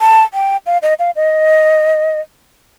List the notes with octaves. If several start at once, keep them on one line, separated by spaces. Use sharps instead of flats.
A5
G5
F5
D#5
F5
D#5